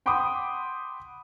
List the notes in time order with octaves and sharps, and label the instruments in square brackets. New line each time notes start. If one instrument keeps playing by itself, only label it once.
[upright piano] F#5 G5 B5 C6 D6 D#6